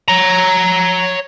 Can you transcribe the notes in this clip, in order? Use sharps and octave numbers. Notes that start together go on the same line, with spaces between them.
C#5 A#5